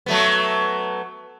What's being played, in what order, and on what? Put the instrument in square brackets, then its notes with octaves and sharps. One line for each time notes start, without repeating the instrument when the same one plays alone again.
[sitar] F#3 A3 B3